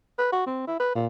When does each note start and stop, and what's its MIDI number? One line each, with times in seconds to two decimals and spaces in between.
0.18 0.29 71
0.32 0.45 66
0.46 0.63 60
0.67 0.79 64
0.79 0.90 71
0.95 1.07 46